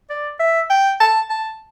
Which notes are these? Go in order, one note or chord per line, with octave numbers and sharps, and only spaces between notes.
D5
E5
G5
A5
A5